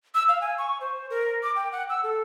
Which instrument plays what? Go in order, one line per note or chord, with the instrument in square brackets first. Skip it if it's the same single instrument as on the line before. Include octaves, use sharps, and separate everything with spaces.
[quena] E6
F5
G#5
C#6
C5
A#4
D6
G5
F#5
E6
A4